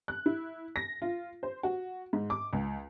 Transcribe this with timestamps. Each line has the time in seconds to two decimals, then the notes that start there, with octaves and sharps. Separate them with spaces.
0.08 F#6
0.26 E4
0.76 A#6
1.02 F4
1.43 C5
1.63 F#4
2.13 G#2
2.30 D6
2.53 C#2